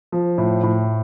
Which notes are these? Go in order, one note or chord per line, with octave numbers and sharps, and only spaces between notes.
F3
A2
A2